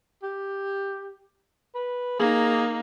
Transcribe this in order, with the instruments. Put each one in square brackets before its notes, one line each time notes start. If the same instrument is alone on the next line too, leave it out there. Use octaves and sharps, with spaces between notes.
[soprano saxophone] G4
B4
[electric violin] A#3 D#4 [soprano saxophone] G#4